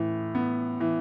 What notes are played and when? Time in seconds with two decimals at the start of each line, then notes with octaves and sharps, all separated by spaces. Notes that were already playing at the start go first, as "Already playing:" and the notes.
Already playing: A2 E3
0.35 B3
0.80 E3